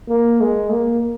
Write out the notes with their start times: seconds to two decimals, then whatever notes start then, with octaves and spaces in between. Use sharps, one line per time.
0.08 A#3
0.41 G#3
0.71 A#3